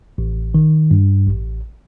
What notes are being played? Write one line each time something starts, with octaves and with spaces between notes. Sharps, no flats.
A1
D#3
G2
A1